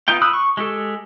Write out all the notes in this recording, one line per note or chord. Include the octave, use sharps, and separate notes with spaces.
B3 D#4 F4 G5
B5 D#6 E6 F#6
C#6
G#3 G4 A4